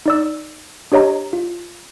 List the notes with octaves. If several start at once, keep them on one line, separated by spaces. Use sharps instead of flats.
D#4 D5 E6
D4 G4 C#5 D#5 A#5
F4